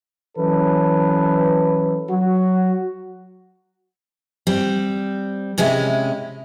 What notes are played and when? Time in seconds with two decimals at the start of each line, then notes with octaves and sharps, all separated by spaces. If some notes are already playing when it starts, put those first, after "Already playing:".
0.38 E3 F#3 C#4 A4 B4
2.09 F#3 F#4
4.47 G3 C4
5.58 C3 G#3 C#4 E4